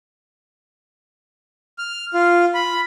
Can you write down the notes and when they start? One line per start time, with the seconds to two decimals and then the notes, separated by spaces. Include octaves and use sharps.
1.78 F6
2.14 F4
2.54 B5